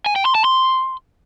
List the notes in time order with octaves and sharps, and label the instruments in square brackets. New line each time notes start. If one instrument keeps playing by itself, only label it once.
[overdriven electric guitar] G#5
G5
C6
A5
C6